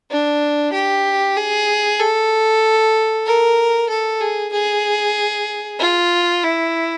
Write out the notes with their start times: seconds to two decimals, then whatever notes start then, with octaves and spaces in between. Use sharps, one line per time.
0.10 D4
0.73 G4
1.37 G#4
2.00 A4
3.26 A#4
3.90 A4
4.21 G#4
4.53 G#4
5.79 F4
6.43 E4